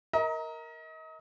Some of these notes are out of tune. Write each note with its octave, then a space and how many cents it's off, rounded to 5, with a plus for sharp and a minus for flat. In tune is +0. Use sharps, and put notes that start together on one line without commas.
A#4 +0 D#5 +35 A#5 +20